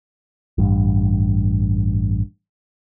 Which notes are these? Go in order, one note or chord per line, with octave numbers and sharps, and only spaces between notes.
A1 G2